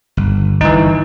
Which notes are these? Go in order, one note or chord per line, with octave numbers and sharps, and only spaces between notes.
G1
G1 E3 D#4